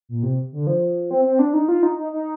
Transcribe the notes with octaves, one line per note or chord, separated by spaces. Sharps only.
A#2
C3
D3
F3
C4
C4
D4
D#4
F4
D#4
D#4
D#4